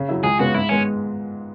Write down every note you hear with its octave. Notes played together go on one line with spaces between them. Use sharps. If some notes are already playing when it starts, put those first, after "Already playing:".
Already playing: C#3
F#3 E4
C#2 G#4
C#3 G#3 B3 F#4
G#2 E4
G#3 B3 C#4